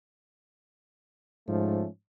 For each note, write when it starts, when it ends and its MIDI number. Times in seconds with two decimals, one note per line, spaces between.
1.48 1.85 44
1.48 1.87 53
1.48 1.87 57
1.48 1.87 61